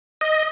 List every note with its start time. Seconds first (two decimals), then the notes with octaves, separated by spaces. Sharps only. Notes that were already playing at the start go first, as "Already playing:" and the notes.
0.21 D#5